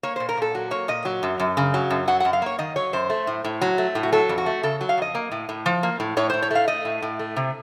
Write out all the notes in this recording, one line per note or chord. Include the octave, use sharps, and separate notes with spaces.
A#3 C#5
A#2 C5
A#4
A#2 A4
F#3 F#4
A#3 C#5
A#2 D#5
F#3
F#2
F#2
C#3
F#3
F#2
F#3 F#5
F#2 F#5
F5
A#3 C#5
D#3 D#5
F#3 C#5
F#2 C5
A3
A2
A2
F#3
A3
A2
F#4
F#3 A4
F2
F#4
A3
C#3 A4
F#3
F5
F2 D#5
A#3
A2
A2
F3
A#3
A2
A2 C#5
A2 C5
C#5
A3 F5
A3 D#5
A2
A2
A3
C3